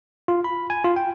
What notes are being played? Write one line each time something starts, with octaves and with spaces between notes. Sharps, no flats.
F4
B5
G#5
F4
G5